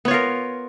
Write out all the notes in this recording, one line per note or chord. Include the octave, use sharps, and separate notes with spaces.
B3 F4 A#4 C#5